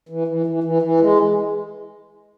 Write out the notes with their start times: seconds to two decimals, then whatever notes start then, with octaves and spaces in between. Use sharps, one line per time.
0.09 E3
0.28 E3
0.46 E3
0.64 E3
0.82 E3
1.00 G#3